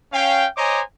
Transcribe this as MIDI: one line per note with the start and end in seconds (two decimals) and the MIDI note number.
0.12 0.45 61
0.12 0.45 77
0.12 0.45 79
0.56 0.80 72
0.56 0.80 73
0.56 0.80 75
0.56 0.80 80
0.56 0.80 82
0.56 0.80 86